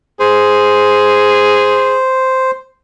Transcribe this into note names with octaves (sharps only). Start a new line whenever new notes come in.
G#4 C5